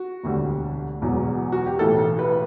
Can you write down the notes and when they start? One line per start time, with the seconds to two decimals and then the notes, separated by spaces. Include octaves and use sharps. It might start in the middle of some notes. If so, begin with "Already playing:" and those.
Already playing: F#4
0.24 E1 D2 D3 G3
1.02 E1 E2 B2 F#3
1.52 F#4
1.66 G4
1.79 B1 A2 E3 A4
2.19 B4